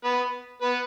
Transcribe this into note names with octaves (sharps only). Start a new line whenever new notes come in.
B3 B4
B3 B4